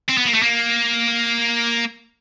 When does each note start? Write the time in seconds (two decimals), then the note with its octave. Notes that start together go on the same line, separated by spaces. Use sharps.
0.09 C4
0.18 B3
0.26 A#3
0.34 A3
0.42 A#3